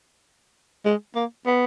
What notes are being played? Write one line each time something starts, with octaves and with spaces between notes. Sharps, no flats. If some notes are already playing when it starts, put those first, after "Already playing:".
G#3
A#3
B3